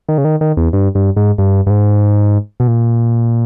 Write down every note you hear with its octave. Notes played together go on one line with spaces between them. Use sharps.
D#3
C#3
D#3
D#3
E2
G2
G2
G#2
G2
G2
G#2
B2
A#2